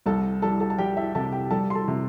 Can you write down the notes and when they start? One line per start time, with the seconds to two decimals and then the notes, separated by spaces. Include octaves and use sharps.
0.06 C2 A4 A5
0.42 G3 A4 A5
0.60 A4 A5
0.70 A5
0.78 G3 G4 G5
0.97 E4 E5
1.15 C3 A4 A5
1.33 G4 G5
1.51 G3 A4 A5
1.70 C6
1.75 A4 A5
1.88 C3